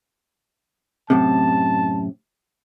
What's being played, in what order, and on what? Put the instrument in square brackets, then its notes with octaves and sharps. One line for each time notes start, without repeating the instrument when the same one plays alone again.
[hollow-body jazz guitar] F#2 A2 C3 [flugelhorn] A5